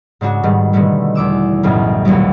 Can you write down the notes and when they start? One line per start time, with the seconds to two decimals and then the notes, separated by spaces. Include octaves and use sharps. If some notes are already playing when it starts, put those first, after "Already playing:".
0.21 G#2 C#3 D4 F#4
0.43 G#2 D#3 G3 B3
0.73 B2 D3 D#3 G3 A3
1.15 E2 D6 E6
1.63 B1 F#2 A2 C#3 G3
2.05 A#1 D#2 B2 F#3 G3